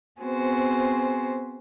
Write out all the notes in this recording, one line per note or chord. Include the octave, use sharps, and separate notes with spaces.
B3 C4 F#4 G#4 C5